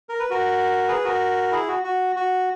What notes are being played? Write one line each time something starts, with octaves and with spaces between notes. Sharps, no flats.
A#4
B4
F#4 A#4
G#4 B4
F#4 A#4
E4 G#4
F#4
F#4
F#4